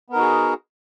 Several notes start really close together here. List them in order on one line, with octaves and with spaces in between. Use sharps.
B3 A#4 D#4 F#4 G#4